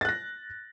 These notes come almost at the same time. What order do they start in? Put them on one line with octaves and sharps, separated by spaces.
A6 F#6 A#6